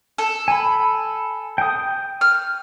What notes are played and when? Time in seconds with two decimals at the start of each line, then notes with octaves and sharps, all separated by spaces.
0.18 A4
0.48 G#5 B5
1.58 G5 D#6
2.21 F6